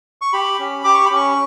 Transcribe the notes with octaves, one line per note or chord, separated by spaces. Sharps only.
C#6
G4 B5
C#4
G4 D6
C#6
C#4 B5
C#6